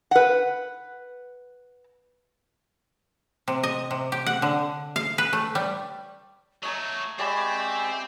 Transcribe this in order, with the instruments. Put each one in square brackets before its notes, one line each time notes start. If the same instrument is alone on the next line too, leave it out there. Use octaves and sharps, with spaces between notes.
[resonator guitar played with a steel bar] B4 F#5
[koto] C3
D#5
C3
G4
F#5
D3
F5
B4
A3
G3
[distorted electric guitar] F#3 A3 [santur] D#5 G#5 A#5 [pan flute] C#6
[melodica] G#3 G4 E5 [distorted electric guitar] C4 [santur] D5 G#5 B5